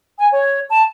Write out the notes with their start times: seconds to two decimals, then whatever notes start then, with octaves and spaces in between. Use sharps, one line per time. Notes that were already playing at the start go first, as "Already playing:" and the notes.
0.18 G#5
0.33 C#5
0.69 A5